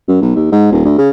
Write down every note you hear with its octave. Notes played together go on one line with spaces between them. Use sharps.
F#2
B1
D#2
G#2
D#1
D2
C#3